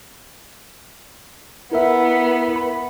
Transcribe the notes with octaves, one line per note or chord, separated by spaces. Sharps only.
B3 E4 A#4 E5
B5